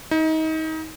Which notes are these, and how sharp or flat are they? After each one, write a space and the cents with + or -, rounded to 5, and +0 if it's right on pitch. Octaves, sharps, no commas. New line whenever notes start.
D#4 +30